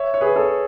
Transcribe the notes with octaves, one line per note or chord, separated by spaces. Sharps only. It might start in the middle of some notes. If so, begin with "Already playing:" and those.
Already playing: C#5 E5
C#5
G#4 B4
A4 C#5